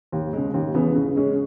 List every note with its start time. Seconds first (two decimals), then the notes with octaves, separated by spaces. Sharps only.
0.12 D#2
0.33 C#3 G#3
0.54 D#2
0.74 C#3 E3 B3
0.95 C#3
1.16 G#3 C#4 G#4